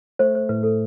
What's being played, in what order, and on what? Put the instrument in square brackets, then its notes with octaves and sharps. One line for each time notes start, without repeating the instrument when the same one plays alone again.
[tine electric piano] A3 [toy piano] C5
[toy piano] C5
[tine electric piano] A2 [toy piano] B4
[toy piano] A4